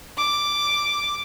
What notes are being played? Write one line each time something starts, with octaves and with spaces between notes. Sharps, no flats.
D6